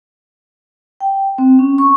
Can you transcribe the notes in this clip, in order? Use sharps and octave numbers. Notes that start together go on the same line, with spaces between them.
G5
C4
C#4
C#6